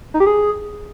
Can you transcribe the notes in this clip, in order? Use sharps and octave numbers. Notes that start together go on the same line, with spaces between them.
D#4
G4
G#4